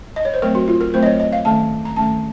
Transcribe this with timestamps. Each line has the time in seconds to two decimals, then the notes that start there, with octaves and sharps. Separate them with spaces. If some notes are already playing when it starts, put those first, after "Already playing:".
0.16 D#5
0.25 C#5
0.34 C5
0.42 F#3 A3 C4 A#4
0.55 F#4
0.68 F4
0.81 A#4
0.94 F#3 A3 C4 C5
1.03 D#5
1.06 C#5
1.20 D#5
1.33 F5
1.45 D#3 A3 C#4 A5
1.85 A#5
1.96 D#3 A3 C#4 A5